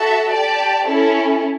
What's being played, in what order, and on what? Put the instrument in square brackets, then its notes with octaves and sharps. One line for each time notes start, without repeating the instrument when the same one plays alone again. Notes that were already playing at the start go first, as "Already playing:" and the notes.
Already playing: [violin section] F#4 A4 E5 A5
G4 D5 A5
C#4 E4 A4